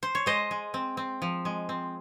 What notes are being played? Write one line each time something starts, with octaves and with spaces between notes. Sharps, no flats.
C5
C#5
G#3 C5 D#5
G#3
C4
C4
F3
G#3
C4